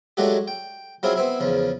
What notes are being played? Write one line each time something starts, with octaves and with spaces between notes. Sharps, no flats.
F#3 G#3 A3 D4 F#4 G4
G5
F#3 C4 E4 F4 G#4
B3 C4 E4
E2 C#3 F3